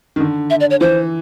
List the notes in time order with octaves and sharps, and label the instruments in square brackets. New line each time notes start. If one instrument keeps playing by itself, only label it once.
[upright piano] D#3
D3
[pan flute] E5
D5
C#5
[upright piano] E3 [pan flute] C5